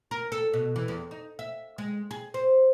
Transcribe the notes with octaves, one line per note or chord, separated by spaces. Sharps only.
A#4
A4
B2
E3
E2
D#4
E5
G#3
G#4
C5